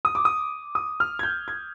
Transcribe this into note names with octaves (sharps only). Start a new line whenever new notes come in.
D#6
D6
D#6
D#6
F6
G#6
G6
G#6